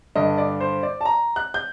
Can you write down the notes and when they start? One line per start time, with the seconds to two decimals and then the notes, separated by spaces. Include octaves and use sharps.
0.16 G2 D3 D#5
0.38 D5
0.60 C5
0.83 D5
1.01 A5
1.05 A#5
1.36 F#6
1.54 G6